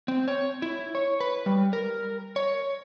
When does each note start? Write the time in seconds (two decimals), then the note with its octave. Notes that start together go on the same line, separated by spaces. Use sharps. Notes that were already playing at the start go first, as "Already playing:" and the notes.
0.08 C4
0.28 C#5
0.62 E4
0.95 C#5
1.20 B4
1.46 G3
1.73 A#4
2.36 C#5